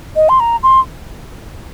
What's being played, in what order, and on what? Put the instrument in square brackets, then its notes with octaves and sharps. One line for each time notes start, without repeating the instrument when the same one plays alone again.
[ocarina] D#5
C6
A#5
C6